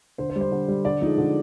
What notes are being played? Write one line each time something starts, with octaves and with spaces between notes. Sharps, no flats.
D3 C5
C5
G3
C5
D3
G3
D3 D5
F3 G#3 D#4
D3